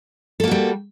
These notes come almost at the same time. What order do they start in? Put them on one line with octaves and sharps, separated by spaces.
A4 A#3 F#4 G3